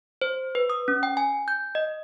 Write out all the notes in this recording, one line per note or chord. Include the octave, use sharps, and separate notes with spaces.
C5
B4
D#6
C#4
G5
G#5
G6
D#5